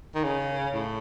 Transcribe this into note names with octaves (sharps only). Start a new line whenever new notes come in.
D#3
C#3
A2